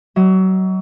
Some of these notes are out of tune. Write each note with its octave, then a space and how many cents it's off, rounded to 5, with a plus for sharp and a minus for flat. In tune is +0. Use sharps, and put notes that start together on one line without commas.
F#3 +30 D#5 +35